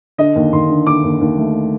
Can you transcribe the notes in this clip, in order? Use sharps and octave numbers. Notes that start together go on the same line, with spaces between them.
D3 D#5
D#2
D#2 C6
D3
D3 D6
D#2
D#2
A3